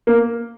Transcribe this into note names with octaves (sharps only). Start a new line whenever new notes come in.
A#3